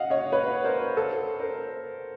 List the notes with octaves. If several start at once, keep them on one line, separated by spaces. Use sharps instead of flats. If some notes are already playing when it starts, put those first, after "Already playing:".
Already playing: D#5 F5 F#5
C#5 D#5
B4 C#5
A#4 C5
A4
A#4 C5